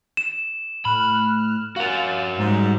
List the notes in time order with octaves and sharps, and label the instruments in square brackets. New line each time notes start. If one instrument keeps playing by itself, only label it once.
[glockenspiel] E7
[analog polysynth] A2 F6 F#6 [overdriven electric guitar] B5
[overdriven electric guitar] F#4 A#4 [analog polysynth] F5 A6
[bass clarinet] G#2 [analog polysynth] G3 G#3